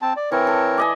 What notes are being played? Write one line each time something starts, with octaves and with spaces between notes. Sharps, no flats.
C4 A5
D5
E3 C4 A#4 C#5
A4
D5 D#5 G#5